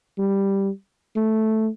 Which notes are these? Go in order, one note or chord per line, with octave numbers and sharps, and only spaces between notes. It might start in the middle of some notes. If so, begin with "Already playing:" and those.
G3
A3